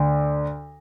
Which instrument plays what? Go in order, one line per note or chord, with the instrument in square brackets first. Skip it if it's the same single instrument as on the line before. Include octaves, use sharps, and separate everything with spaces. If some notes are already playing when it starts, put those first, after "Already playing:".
Already playing: [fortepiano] D2